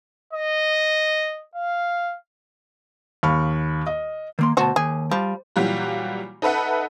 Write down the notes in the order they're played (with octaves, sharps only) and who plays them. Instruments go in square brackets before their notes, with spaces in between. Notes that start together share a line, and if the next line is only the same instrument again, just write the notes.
[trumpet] D#5
F5
[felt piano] D#2 F5 B5 C#6 F6
D#5
[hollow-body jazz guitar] D#3 A#3 C6
[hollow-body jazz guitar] D2 B2 A5 [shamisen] F#4 C5
[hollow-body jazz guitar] D#2 [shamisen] G#4
[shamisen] F3 [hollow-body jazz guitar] G3
[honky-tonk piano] A#2 E3 F#3 G3 F4 F#4
D#4 A4 B4 E5 F#5